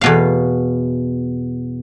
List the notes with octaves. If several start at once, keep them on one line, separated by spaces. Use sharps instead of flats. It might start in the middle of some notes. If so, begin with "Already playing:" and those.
E2 B2 F5